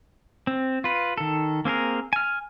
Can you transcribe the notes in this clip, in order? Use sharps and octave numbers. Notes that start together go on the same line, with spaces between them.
C4
F4 B4
D#3 A4
A#3 C4 G#4 A#4
G#5 F6